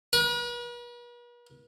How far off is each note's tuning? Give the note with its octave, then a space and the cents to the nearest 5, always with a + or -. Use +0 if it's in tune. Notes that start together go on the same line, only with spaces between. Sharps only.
B4 -45